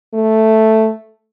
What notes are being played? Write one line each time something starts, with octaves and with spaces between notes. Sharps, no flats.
A3